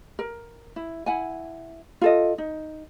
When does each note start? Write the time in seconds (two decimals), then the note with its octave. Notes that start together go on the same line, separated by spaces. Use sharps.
0.19 A#4
0.76 E4
1.06 E4 F#5 G#5
2.01 F4 A4 D#5
2.38 D#4